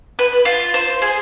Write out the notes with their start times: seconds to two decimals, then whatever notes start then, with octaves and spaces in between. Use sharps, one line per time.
0.19 B4
0.45 F4
0.74 C5
1.02 G#4